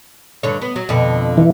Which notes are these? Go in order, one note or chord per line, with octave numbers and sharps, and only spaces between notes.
G2 D3 C#5
B3
F#3
F2 B2 D3
E3